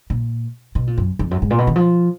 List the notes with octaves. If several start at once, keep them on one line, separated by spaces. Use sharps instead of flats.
A#2
B2
A#2
F#2
F2
F#2
G#2
A#2
B2
D#3
F3